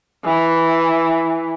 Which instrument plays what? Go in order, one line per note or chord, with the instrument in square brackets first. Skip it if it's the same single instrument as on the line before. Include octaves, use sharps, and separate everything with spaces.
[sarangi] E3